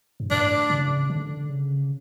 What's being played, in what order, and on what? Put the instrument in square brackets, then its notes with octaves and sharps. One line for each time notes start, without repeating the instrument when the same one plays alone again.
[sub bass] G2
[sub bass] A2 [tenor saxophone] D4
[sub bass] C#3
D3
C#3